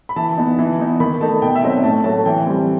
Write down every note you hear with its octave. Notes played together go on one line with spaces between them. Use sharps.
B5
E3 A5
B3 D#4
E3
B3 D#4
D#3 B5
A3 D#4 A5
B2 G5
E5
F#3 C4 D#4 D#5
E5
A2 A5
F#3 A3 A5
E3 G5
G3 C4